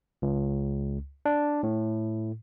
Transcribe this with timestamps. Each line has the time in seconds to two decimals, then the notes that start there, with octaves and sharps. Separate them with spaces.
0.22 C#2
1.26 D4
1.63 A2